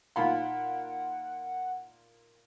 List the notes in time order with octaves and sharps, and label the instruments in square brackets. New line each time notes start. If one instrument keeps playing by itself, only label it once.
[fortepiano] A#2 B5 C6 [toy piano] D#4 F5 [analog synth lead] F#5